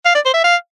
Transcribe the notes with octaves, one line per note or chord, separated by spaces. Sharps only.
F5
D5
C5
E5
F5